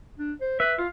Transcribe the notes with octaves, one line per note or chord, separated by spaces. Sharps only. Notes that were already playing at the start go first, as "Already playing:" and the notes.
D4
C5
B4 E5
F4 F5